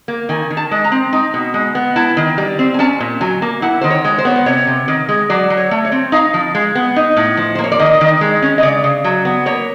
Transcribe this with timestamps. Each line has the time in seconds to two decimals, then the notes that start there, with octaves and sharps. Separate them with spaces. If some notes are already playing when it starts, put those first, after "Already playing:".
0.08 A#3
0.29 D#3 G#5
0.50 D#3
0.57 A5
0.71 G#3
0.84 A#5
0.92 C4
1.13 D#4
1.34 B2
1.54 G#3
1.75 B3
1.96 E4 A5
2.17 D#3
2.38 G3
2.59 C4
2.74 G#5
2.79 C#4 A5
3.00 A#2
3.21 F#3 G#5
3.42 A#3
3.62 E4 F#5
3.81 D#3 C5
3.90 C#5
4.05 G#3
4.18 C5
4.25 B3 C#5
4.36 C5
4.46 C3 C#5
4.67 C3
4.88 D#3
5.09 G#3
5.30 F#3 D5
5.50 F#3
5.57 C#5
5.71 A3
5.85 C#5
5.92 C4
6.12 D#4 F5
6.34 F3
6.55 G#3
6.75 B3
6.96 D#4
7.17 A2
7.37 F3
7.55 C5
7.59 A#3
7.64 C#5
7.72 D5
7.80 D#3 D#5
8.01 D#3
8.21 G#3
8.43 C#4
8.58 D#5
8.63 C#3 D5
8.84 C#3
9.04 F#3
9.25 B3
9.46 A#3 C#5